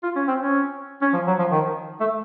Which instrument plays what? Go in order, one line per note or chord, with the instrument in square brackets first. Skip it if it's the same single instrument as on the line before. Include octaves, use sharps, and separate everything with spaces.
[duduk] F4
C#4
C4
C#4
C#4
F3
F#3
F3
D#3
A3